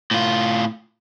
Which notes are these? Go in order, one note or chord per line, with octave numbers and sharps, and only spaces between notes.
A2 F4